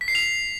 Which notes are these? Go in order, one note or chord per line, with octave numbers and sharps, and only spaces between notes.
B6
C7
F7